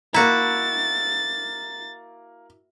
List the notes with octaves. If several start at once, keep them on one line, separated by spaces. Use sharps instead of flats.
A#3 E4 F#4 A#5 A6